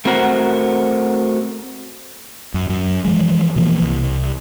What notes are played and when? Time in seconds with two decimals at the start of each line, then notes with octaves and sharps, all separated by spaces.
0.05 A3 C4 F#4 A#4 C5 F#5
2.54 F#2
2.69 F#2
3.05 E3 F3 G#3
3.56 B2 E3 F3 A#3
3.82 C2